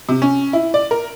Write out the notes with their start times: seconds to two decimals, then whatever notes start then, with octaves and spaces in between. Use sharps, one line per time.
0.09 C3
0.22 C#4
0.53 E4
0.74 D5
0.91 A#4